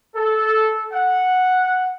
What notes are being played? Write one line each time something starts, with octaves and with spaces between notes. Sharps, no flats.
A4
F#5